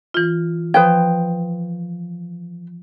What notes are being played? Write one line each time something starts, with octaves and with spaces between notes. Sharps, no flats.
E3 F4
F3 B4 C5 G5 D#6